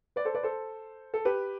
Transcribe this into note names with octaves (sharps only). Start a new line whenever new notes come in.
B4 D5
A4 C5
B4 D5
A4 C5
A4
G4 B4